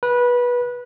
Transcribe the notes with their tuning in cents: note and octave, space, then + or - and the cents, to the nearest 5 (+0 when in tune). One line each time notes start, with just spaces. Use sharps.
B4 -20